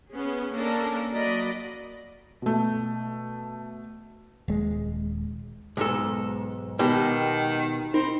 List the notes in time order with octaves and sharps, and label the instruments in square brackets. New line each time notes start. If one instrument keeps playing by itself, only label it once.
[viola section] B3 C#4 G#4
A#3 C#4 D4 A4 A#4
F#3 A#3 D5 D#5 B5
[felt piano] B2 A3
[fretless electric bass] D#1 G#3
[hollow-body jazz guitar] B1 G#2 A4 [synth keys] G#3
[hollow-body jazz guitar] B2 G4 [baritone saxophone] D#3
[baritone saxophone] C4 [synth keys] D#4 A#4 B5